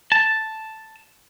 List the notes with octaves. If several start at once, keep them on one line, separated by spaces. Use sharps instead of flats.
A5